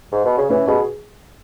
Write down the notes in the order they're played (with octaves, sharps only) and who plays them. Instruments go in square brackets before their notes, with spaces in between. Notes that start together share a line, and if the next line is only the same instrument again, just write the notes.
[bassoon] G#2
B2
C#3
[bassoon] E3 [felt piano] C#4
[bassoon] B2 [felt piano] G#4